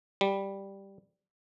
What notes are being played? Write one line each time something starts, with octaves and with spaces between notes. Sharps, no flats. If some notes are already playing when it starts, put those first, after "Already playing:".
G3